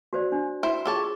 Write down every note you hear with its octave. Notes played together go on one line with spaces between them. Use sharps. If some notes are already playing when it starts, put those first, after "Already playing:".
F#4 C5 D5
D4
E4 C5
F4 G#4 A4 C#5 A5